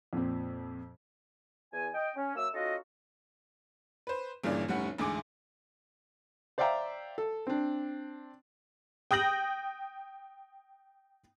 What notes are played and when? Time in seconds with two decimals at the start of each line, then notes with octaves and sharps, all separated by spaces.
0.13 F2 A#2 C4
1.73 E2 G#5
1.94 D#5 G5
2.16 C#4
2.36 F#3 A#3 E5 E6
2.54 C#4 D#4 F4 F#4 A4 D#5
4.07 B4 C5
4.44 G1 G2 A#2 C#3 E3 D5
4.68 F1 A2 G3 C#4 F#5
4.98 A1 D2 G#2 G#4 G#5 D6
6.58 C5 D5 E5 F5 G5 A#5
7.18 A4
7.47 C4 D4
9.11 G5 D#6 G6 A#6 F#7